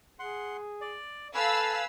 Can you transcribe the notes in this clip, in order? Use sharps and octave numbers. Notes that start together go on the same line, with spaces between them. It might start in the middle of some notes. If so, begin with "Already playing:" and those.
G#4 F#5 C6
D5
A4 B4 F5 G#5 B5 E6